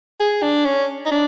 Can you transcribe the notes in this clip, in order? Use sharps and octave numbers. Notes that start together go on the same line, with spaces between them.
G#4
D4
C#4
D#4
D4